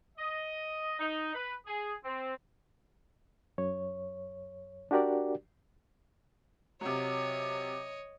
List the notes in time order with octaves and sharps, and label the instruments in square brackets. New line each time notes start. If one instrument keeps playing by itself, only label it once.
[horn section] D#5
D#4
B4
G#4
C4
[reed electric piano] F#2 C#5
D4 F#4 G4 A#4 D5
[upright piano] C3 F#3 [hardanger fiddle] C#5 D#5